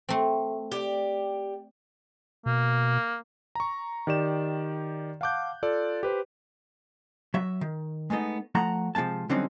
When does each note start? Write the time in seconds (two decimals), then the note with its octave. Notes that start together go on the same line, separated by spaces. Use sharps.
0.09 A3 C4
0.72 G4 D5
2.46 B2 A#3
3.55 A#5 C#6
4.07 D#3 G4 D5 E7
5.21 F5 F#5 A5 D6 F#6 G6
5.63 F4 A4 D5
6.03 G4 B4 C5
7.34 F#3 E5
7.61 D#3
8.10 G#3 A3 B3 D#4
8.55 F3 A3 F#5 A#5
8.95 C3 F3 G#3 A#3 A5
9.29 D3 F#3 G3 C4 C#4 D#4